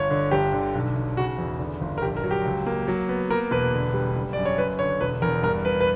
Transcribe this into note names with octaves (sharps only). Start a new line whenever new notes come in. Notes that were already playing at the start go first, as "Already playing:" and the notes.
Already playing: G1 C#5
D3
G1 G4
D3
B1
B1
C#3 F#4
E2
D3
G1
A#4
A#1 G4
A#4
F#3
G4
C#2
A#3
F#3
B3
A#3 A#4
E1 B4
D3
G3
F#1
F#2 D5
C#5
F#1 B4
D3 C#5
E1 B4
E2 A#4
G2 A#4
G2 B4
B4